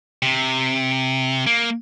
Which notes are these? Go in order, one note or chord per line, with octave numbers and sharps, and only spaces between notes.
C3
A#3